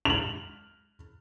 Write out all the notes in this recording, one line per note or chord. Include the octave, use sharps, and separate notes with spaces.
F7 F#7